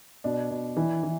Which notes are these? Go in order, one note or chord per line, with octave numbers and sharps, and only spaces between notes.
B2 D4
B2
E3
E3